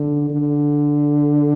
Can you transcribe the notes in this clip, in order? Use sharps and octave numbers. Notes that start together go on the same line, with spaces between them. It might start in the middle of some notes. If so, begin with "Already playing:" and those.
Already playing: D3
D3